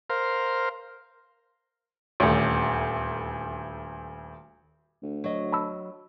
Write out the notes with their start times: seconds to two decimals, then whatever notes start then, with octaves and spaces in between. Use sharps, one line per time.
0.10 A#4 C5 F5
2.20 D#1 D2
5.03 D2
5.24 F#3 D#5
5.52 A5 B5 E6